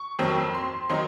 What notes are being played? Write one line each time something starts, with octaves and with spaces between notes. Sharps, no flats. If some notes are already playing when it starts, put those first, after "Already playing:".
Already playing: C#6
F2 D#3 F#3 C4
C6
D#3 F#3 C4 D#4 C6